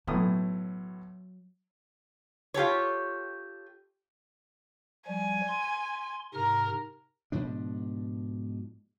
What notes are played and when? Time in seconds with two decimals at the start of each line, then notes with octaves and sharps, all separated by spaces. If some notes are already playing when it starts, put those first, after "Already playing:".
0.07 B1 A2 F#3 D#6
2.54 F4 G4 A4 C#5
5.07 F3 G3 G#5
5.47 C6
6.34 G#2 C3 A#4 F6
7.32 G#2 B2 F3 D4